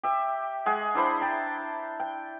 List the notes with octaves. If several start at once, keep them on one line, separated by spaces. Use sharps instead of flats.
G4 E5
G#3 G#4 F#5
D4 E4 C5 B5
G5 A5 A#5
G5